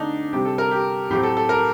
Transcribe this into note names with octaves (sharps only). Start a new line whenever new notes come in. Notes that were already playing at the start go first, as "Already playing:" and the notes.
Already playing: D3 A3 C4 D4 D#4
C3 G3 C4 G4
A4
A#4
G4
A2 F#3 A3 C4 G4
A4
A4
A#4